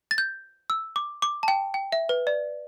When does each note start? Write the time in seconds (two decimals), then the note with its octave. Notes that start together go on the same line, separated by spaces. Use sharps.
0.11 A6
0.18 G6
0.70 E6
0.96 D6
1.22 D6
1.43 A5
1.48 G5
1.74 G5
1.92 E5
2.09 B4
2.27 D5